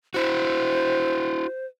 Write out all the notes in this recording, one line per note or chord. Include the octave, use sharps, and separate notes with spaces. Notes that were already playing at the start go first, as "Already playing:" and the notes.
E4 F#4 C5